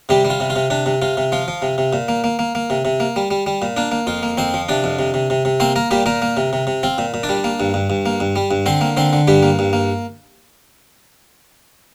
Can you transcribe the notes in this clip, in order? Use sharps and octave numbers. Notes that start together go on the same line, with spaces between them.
C3 G3 G4
G3
F4
C3
F4
C3
C3 D4
C3
C3 F4
C3
F3 F4
F3
C3
C3
A#2
A#3
A#3
A#3
A#3
C3
C3
A#3
G3
G3
G3
A#2
A#3 D4
A#3
F2 F4
A#3
F2 C4 C5
F3
C3 D4 D5
F2
C3
C3
C3
C3
A#3 C4 C5
A#3 A#4
A#2 G3 G4
A#2 A#3 A#4
A#3
C3
C3
C3
C4 F4
A#2
A#2
D4 D5
G3
A#3
G2
G2
G2
A#3
G2
G3
G2
D3 C4 C5
A#3
D3 C4 C5
D3
G2 G3 G4
A#3
G2
A#3